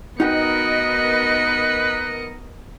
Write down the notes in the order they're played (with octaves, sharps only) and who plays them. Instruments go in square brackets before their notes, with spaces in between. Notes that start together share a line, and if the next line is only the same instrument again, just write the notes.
[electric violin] B3 C#7 [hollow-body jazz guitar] D#4 F#4 G5 [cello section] A#4 D#5 [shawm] B4